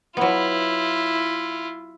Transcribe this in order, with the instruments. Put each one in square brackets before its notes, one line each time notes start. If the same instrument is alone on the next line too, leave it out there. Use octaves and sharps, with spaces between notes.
[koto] F#3 B3 [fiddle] E4 F4